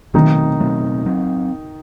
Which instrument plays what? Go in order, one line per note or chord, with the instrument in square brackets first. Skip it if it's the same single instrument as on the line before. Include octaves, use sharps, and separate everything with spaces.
[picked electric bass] B2 F#3 A3 C4 [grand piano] D#3 D#4
[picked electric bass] B2 F#3 A3 C4
F#3 C4